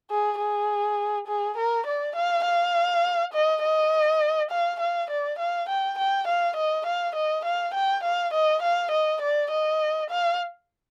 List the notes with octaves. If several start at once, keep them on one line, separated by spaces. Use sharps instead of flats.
G#4
G#4
G#4
A#4
D5
F5
F5
D#5
D#5
F5
F5
D5
F5
G5
G5
F5
D#5
F5
D#5
F5
G5
F5
D#5
F5
D#5
D5
D#5
F5